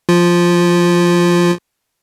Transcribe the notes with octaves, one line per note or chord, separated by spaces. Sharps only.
F3 F4